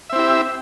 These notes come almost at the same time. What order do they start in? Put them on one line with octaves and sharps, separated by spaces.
E5 C4 E4 G4